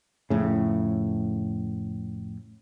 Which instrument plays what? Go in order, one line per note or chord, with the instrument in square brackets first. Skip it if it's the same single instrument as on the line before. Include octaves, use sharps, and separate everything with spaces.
[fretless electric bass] F2 A2 C#3